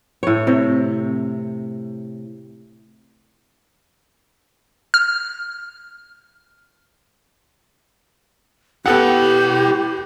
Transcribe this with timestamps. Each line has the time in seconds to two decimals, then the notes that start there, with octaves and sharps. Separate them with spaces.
0.23 A2 C#5
0.47 C3
4.94 F6
8.86 B3 E4 G4 A4 F#5 G5